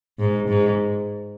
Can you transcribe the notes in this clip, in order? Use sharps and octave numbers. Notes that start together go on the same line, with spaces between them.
G#2
G#2